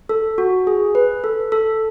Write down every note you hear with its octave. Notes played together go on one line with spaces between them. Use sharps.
A4
F#4
G#4
B4
A4
A4